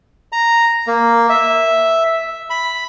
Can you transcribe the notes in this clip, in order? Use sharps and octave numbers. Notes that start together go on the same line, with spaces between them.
A#5
A#3
E5
B5